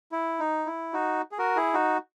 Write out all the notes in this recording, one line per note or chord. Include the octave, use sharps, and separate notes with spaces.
E4
D#4
E4
D#4 F#4
G#4
F#4 A#4
E4 G#4
D#4 F#4